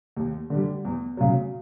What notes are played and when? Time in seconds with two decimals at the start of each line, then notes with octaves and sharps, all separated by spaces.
0.17 D#2
0.50 D3 G3
0.85 E2
1.17 C#3 F#3